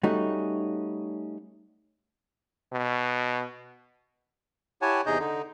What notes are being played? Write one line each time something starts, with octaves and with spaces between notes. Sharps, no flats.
G3 A3 C#4 D#4 F#4
B2
E4 G4 C#5 F#5 G#5 A5
E2 C3 D#4 G#4 D#5 G6
D3 D#4